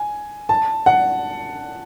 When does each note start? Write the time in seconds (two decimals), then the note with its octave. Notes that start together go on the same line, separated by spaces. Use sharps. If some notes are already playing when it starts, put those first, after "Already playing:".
Already playing: G#5
0.49 A5
0.86 F#5